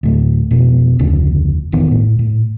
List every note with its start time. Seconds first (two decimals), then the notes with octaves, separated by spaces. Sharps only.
0.03 D2 A2
0.51 F1 B2
0.99 F1 D2 C#3 D4
1.72 E1 A1 D#3 B3
1.91 A2
2.19 A2